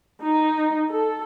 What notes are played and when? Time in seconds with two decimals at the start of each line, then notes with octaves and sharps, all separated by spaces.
0.23 D#4
0.90 A4